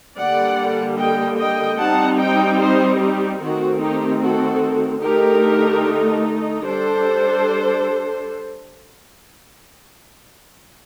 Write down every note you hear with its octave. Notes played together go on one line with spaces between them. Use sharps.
D3 G3 A#3 D5 F#5
D#5 G5
D#5 G5
G3 C4 D#4 F#5 A5
D#5 G5
C5 D#5
D#4 G4
D#3 A3 C4 F#4
D#4 G4
F#4 A4
D3 A3 D#4 G4 A#4
G3 D4 A4 C5